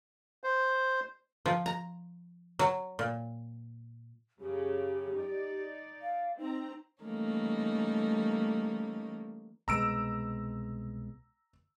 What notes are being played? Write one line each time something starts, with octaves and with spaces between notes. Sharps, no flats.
C5
F3
A#5
F#3
A#2
F#2 C#3 G4
D#4 D5
F5
C4 D#4 A#5
E3 G3 A3 A#3 C#4 D#4
C2 B2 G#3 A#5 E6 D7